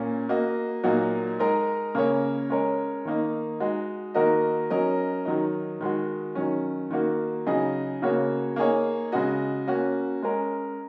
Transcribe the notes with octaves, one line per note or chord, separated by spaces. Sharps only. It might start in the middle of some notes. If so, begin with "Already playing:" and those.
Already playing: A#2 A#3 C#4
A#3 F#4 D#5
A#2 F#3 A#3 D#4 F#4
G#3 D#4 A#4
C#3 A#3 C#4 A#4 C#5
G#3 C#4 A#4 C#5
D#3 A#3 D#4
G#3 D#4 F#4
D#3 A#3 F#4 A#4 D#5
F#3 C#4 A#4 D#5
D#3 F#3 D#4
D#3 G#3 F#4
D#3 F#3 C#4
D#3 A#3 F#4
C#3 F#3 D#4 G#4 D#5
C#3 A#3 F#4 C#5
A#3 D#4 G#4 C#5
C#3 G#3 F#4 D#5
A#3 C#4 F#4
G#3 C#4 A#4